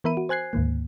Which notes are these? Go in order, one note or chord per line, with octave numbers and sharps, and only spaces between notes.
E3 B3 A#4 E5 B5 D#7
F#4
C5 G#5 F#6 G#6 C7
D2 G#2 D#3 A#3